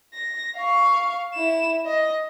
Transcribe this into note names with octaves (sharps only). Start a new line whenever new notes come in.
A#6
F5 C#6
E4 E7
D#5